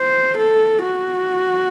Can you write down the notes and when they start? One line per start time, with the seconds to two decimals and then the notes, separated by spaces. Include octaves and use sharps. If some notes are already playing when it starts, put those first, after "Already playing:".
Already playing: C5
0.38 A4
0.83 F#4